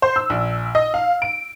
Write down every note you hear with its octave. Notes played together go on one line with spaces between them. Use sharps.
C5
E6
A#1
D#5
F5
D7